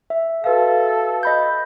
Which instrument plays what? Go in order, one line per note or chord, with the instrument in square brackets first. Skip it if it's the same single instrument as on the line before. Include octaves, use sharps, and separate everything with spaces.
[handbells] E5
[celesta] F#4 B4 F5 [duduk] A4
[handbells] D#5 B5 G6